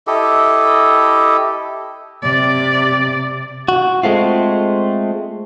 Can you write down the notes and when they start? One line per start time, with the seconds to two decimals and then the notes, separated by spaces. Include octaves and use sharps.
0.07 E4 G4 A4 D#5
2.22 C3 D5
3.68 F#4
4.03 G#3 A3 C4 F4